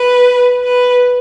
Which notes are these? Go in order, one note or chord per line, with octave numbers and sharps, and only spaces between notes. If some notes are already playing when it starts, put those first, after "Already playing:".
Already playing: B4
B4